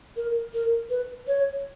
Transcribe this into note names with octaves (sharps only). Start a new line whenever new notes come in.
A#4
A#4
B4
C#5